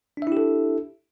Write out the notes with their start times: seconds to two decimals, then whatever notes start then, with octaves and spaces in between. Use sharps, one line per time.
0.17 D4
0.22 E5
0.27 E4
0.32 G4
0.37 A4